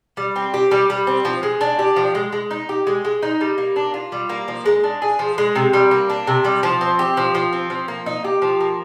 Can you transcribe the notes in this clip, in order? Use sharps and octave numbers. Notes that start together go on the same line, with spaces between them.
G3
C4
G4
G3
G3
C4
F3
G#3
D4
G4
F3
G#3
G#3
D#4
G4
G#3
G#3
D#4
G3
A#3
D4
F4
G3
A#3
F3
G#3
D4
G#4
F3
G#3
C3
G3
A#3
D4
C3
G3
F3
C4
G4
F3
F3
C4
F3
A#3
D#4
G4
F3
A#3